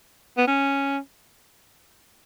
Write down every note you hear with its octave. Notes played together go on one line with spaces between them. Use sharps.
B3
C#4